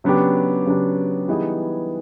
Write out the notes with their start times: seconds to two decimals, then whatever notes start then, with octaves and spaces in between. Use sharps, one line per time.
0.04 C#3 F#3 B3 D4 G4
0.66 C#3 F#3 B3 D4 G4
1.28 E3 G3 B3 D#4 G#4